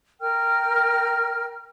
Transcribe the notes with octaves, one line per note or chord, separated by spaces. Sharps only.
A#4 G5 F6